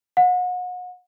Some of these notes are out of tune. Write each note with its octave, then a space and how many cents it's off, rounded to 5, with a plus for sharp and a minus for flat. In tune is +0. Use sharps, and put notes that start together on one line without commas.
F#5 -35